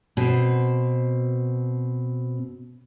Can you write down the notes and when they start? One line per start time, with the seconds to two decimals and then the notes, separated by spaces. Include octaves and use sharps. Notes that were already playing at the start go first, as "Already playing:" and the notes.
0.17 B2 C4